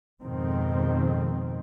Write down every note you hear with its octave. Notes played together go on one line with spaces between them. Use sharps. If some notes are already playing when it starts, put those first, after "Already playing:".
F2 G#2 B2 D#3 C4